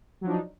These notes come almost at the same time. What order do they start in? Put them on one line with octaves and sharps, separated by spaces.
F#3 F3 D4 D#4